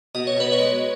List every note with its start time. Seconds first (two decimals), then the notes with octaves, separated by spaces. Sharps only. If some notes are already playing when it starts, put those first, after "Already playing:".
0.15 B2 D#5
0.27 C#5
0.37 B2 B4
0.52 C#5
0.59 G#3